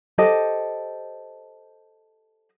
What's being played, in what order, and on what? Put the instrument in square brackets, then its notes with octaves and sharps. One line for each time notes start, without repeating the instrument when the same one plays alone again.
[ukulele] G4 A4 C5 D#5